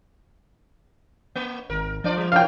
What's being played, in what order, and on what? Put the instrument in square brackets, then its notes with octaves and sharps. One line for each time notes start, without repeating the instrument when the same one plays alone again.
[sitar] A#3
[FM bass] G#1 [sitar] A#4
[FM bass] F3 [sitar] D4 F4 D5
[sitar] G3
[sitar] A#2 C#4 [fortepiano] F5 G5